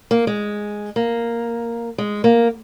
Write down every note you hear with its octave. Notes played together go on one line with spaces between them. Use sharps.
A#3
G#3
A#3
G#3
A#3